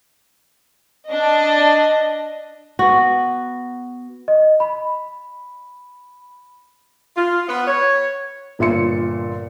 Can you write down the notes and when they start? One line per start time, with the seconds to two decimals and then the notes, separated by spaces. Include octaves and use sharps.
1.09 D4 D#5
2.79 B3 F#4
4.28 D#5
4.60 B5
7.16 F4
7.47 B3
7.67 C#5
8.59 G1 A#2 E5 C6 C#7